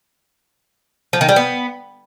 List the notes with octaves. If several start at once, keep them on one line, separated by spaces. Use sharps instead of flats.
F3
D#3
G3
B3